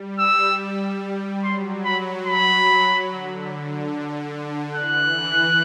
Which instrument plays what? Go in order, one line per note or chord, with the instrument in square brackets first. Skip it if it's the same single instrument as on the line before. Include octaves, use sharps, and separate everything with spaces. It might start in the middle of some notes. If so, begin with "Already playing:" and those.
Already playing: [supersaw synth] G3
[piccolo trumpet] E6
[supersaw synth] F#3 [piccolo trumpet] C6
[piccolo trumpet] B5
B5
[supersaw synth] D3
D3
D3
[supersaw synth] E3 [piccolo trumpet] F#6